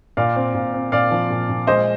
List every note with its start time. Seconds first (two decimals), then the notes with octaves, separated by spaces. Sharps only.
0.17 A#2 D5 F5
0.36 C4
0.54 A#2
0.73 C4
0.92 A#2 D5 F5
1.11 F3
1.30 A#2
1.49 A#2
1.67 G#3 C5 D#5